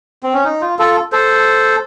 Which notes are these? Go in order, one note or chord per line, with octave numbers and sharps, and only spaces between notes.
C4
C#4
D#4
F4
F4 A4
A4 C5